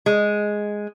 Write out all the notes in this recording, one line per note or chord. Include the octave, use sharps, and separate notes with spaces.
G#3